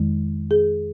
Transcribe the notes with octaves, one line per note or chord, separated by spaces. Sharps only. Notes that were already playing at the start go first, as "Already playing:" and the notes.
Already playing: F2 D#3 G#3
G#4